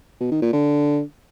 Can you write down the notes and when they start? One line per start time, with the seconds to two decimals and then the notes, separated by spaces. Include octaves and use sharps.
0.21 B2
0.31 D#3
0.42 A#2
0.53 D3